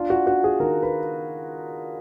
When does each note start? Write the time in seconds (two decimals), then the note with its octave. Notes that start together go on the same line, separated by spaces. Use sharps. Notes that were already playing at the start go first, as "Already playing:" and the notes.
Already playing: D4 F4
0.10 F#4
0.26 D4 F#4
0.44 G#4
0.60 D#3 A#4
0.83 B4